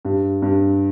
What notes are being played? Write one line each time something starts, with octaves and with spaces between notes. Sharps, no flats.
G2
G2